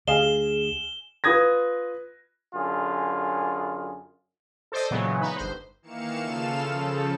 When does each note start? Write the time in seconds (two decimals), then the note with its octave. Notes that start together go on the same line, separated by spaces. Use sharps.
0.08 D2 D3 G#4 D#5 F5 G#5 E7 G7
1.24 F4 B4 D#6 G#6 A#6
2.54 F#2 D3 F4 G#4
4.72 A4 C5 D5 D#5
4.91 A#2 C#3 E3 F#3 G#3 B3
5.21 B3 D#4 B4
5.36 G1 C5
5.82 D#3 E3 A#3 F5 C#7 E7
6.20 C#3 F4 A4 F5 E7
6.62 C#3 F3 A4